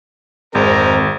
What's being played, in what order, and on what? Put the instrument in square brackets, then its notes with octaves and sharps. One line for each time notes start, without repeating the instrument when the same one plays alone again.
[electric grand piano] G#1 [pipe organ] F2 D#3 C5 [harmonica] G#3 A#4